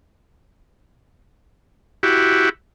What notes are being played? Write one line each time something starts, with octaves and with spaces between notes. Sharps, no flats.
E4 F#4 G4